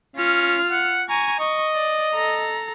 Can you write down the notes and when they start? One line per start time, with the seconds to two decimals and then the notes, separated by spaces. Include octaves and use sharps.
0.16 C#4 F4 F6
0.71 F#5
1.09 G#5 A#5 C#6
1.39 D#5 C#6
1.74 D5
2.14 A4 A#5